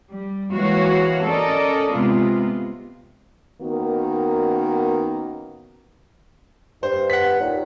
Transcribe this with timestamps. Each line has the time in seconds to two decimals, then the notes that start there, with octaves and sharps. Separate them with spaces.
0.11 G3
0.53 E3 G#3 A#3 F#4 C#5 F5
1.24 C#4 A4 A#4 D5 D#5
1.92 C3 G#3 B3 F4
3.61 D#3 A#3 B3 C#4 F#4 A#4
6.83 G2 C5
7.10 F#5 B6
7.38 D#2 A#2